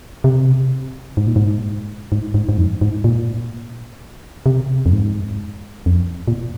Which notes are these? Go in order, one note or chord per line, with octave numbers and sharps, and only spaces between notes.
C3
G#2
A#2
G#2
G#2
G#2
G#2
F2
G#2
A#2
C3
F2
G#2
F2
A#2